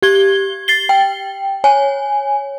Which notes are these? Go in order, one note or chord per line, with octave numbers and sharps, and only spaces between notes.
G4 G#6 G7
A6 C7 G7
G5
C#5 G#5